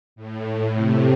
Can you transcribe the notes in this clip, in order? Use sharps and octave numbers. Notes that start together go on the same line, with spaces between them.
A2
C3